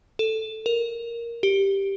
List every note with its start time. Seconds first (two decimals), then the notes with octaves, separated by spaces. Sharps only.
0.19 A4
0.66 A#4
1.43 G4